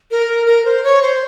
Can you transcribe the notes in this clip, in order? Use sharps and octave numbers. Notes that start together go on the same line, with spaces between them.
A#4
A#4
C5
C#5
C5